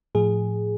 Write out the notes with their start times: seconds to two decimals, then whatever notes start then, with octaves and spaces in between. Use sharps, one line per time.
0.15 A2 F3 G#4